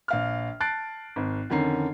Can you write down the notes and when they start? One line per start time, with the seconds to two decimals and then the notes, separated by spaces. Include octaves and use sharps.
0.08 A#1 F5 F6
0.60 A5 F#6 A6 C7 D7
1.16 G#1
1.50 F2 D3 D#3 C#4 A#5 C7